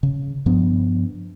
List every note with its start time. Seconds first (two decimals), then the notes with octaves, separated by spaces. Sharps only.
0.03 C#3
0.46 G2 F3 B3 D4